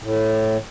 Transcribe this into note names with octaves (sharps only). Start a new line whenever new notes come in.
A2